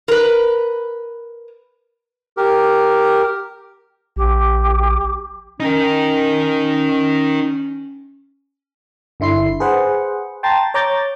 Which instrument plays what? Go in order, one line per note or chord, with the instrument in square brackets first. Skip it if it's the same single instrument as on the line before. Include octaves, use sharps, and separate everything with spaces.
[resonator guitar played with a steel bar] A#4 B4
[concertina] G4 A#4
[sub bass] A#1 [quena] G4
[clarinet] C#4 [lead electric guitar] D#4 A#4
[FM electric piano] G1 D3 E4 C6 C7
G#4 B4 C5 F#5
G5 A5 A#5 C6 A6
C#5 A#5 D6 G6 A6